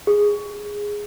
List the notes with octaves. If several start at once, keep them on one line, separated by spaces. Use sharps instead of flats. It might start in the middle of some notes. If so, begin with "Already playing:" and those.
G#4